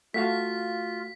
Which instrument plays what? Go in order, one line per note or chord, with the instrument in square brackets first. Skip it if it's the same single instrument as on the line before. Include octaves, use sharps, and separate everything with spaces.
[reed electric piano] A3 F#4 F5 [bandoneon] F4 [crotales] B6